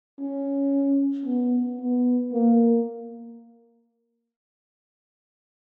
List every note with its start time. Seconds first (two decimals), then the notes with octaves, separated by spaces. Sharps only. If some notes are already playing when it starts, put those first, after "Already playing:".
0.20 C#4
1.26 B3
1.80 B3
2.33 A#3